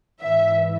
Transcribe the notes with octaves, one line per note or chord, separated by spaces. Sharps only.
G#2 E3 E5